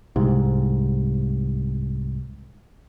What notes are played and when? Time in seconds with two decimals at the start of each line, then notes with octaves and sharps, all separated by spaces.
0.16 C2 G#2